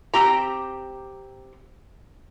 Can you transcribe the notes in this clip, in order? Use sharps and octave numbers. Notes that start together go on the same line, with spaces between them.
C4 G4 A#5